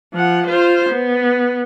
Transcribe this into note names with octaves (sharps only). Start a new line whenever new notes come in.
F3 F#5
F4 C5
B3